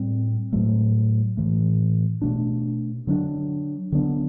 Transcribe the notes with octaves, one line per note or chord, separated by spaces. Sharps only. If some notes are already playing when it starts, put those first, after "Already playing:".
Already playing: A2 G3 C4
A2 F#3 A3
A2 E3 A3
B2 A3 D4
D3 F#3 A3 D4
D3 F#3 B3 D4